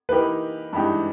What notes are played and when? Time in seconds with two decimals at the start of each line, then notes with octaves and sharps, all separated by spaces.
0.09 E3 A#3 D#4 G4 A#4 B4
0.73 G2 E3 G#3 D#4 G4